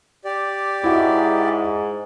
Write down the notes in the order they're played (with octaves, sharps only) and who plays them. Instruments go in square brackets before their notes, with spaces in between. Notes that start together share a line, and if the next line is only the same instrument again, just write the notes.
[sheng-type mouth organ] G4 D5
[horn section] G#2 [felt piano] E4 F#4